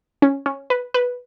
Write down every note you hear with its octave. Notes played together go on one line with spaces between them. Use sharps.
C#4
C#4
B4
B4